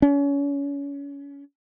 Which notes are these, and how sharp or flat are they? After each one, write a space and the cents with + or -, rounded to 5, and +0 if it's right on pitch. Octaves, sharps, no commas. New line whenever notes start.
C#4 +30